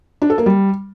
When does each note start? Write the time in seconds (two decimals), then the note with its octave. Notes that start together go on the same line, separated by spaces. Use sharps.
0.22 D4
0.30 A4
0.38 A#3
0.46 G3